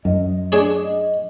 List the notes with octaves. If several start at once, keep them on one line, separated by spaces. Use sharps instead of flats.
F#2 D#5
D4 G#4 C#5